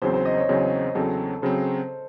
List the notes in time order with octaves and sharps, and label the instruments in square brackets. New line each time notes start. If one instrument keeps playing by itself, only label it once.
[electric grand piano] E2 C#3 F#3 C4 [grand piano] C5
[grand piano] C5
D#5
C#5
[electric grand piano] E2 C#3 F#3 C4
[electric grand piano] E2 C#3 F#3 C4 [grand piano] A4
[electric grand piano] C#3 F#3 C4 [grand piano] C5